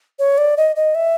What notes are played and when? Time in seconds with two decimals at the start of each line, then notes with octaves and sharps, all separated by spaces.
0.19 C#5
0.38 D5
0.57 D#5
0.76 D#5
0.95 E5